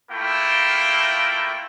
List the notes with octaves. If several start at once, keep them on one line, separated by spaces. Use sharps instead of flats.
A3 A#3 E4 F4 G5